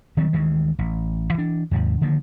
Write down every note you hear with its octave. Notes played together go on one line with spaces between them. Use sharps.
D#3 F#3 G3 C4
D2 D#3 E3 G#3
A1
E3 D4
D#2 G#2 C3
D3 D#3 F3 A#3